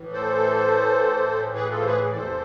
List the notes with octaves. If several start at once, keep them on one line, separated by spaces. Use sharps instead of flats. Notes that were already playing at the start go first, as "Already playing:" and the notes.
Already playing: A2 E3
A4 C5
G#4 B4
F4 A4
C5
G#4 B4
D5
E2 C3 E3 A4 C5